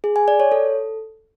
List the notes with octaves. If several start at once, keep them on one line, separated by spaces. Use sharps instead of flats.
G#4
G#5
D5
C#5
A4